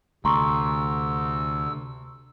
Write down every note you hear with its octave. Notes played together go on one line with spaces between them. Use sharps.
D2 C3 A#5 C6 C#6 E6